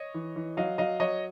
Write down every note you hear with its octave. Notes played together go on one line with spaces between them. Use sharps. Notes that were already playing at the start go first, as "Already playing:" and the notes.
Already playing: C#5 D#5
E3
E3
F#3 D#5 F5
F#3 D#5 F5
F#3 C#5 D#5